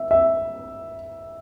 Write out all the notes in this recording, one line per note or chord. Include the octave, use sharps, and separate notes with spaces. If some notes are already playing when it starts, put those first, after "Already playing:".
Already playing: E5
E5